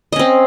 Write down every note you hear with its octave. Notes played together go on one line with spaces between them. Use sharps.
C4 C#4 D#5